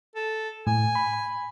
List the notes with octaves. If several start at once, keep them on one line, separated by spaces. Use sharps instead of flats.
A4
A2 G#5
B5